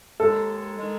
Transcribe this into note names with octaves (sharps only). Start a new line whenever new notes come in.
D#2 D#3 G#3 A4
D#3 G#3